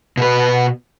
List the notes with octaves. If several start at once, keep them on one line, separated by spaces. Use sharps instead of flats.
B2 B4